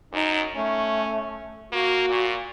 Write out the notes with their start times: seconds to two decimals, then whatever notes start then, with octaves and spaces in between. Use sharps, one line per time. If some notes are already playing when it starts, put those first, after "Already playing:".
0.13 F#2 D#4
0.56 A3 C#4
1.72 A#3 F#4
2.10 A#2